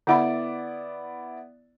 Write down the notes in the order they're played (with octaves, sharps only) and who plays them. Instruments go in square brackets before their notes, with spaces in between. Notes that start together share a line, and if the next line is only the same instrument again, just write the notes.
[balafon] D3 F#5 B5 [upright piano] B3 E4 D5